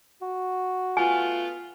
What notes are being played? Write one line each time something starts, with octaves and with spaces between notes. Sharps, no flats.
F#4
A3 B3 F4 G#5